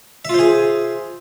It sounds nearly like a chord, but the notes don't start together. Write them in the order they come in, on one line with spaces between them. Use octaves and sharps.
E5 F4 C5 G#4